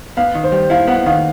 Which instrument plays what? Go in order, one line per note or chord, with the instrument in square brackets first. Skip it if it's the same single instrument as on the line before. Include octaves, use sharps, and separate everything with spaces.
[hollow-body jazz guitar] B3 [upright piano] F5
[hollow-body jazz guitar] D#3
[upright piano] C5
[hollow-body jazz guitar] G3
[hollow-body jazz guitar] E4 [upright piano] F5
[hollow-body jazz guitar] B3 [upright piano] F#5
[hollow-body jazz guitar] D#3 [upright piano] F5